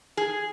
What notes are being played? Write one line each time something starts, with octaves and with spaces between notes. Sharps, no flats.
G#4